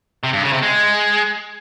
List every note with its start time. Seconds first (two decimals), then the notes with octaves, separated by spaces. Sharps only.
0.23 C3
0.33 G2
0.43 C#3
0.53 C3
0.63 G#3